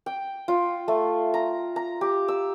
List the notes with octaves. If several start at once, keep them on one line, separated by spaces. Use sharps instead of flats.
G5
F4
A3
A#5
A#5
G4
E6